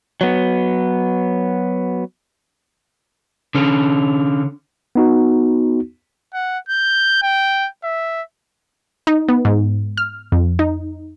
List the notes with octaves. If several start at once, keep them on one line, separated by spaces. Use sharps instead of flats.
F#3 B3
D3 C#4
B3 D#4 F#4
F#5
G6
G5
E5
D#4
B3
G#2
F6
F2
D#4